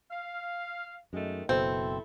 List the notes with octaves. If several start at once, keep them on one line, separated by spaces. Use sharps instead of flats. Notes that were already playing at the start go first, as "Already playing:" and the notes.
F5
F#2 D#3 G#3 A3
F#1 B2 C4 E4 A4